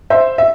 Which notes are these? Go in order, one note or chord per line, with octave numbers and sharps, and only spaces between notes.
C5 E5
E5